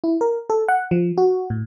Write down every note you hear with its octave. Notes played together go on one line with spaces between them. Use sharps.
E4
A#4
A4
F#5
F3
F#4
A2